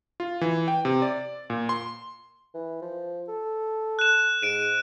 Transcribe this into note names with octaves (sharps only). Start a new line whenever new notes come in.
F4
E3
G5
C3
D5
A#2
C6
E3
F3
A4
F#6 E7
G#2 D7 D#7